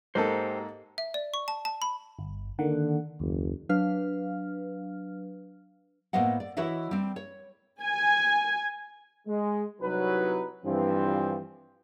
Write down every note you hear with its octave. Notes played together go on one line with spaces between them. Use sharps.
G#2 A#3 G4 A4 C5
E5
D5
C#6
A5
A5
B5
G1
D3 D#3 A#3 F#5
F#1 D#2
F#3 D4 B4 F5 F6
A2 A#3 B3 C5 D#5 F#5
D5
E3 E4 F#4 C#5 D#5 E5
G3 C4
C#5
G#5
G#3
C2 F#3 D#4 B4
G2 E3 F3 C4